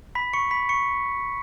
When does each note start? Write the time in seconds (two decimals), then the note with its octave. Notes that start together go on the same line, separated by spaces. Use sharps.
0.15 B5 B6
0.33 C#6 C#7
0.51 B5 B6
0.69 C#6 C#7